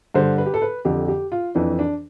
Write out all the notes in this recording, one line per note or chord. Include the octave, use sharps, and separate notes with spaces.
G2 D3 C5
B4
G4
A4
B4
F2 D3 G4
G4
F4
F2 E3 D4
D4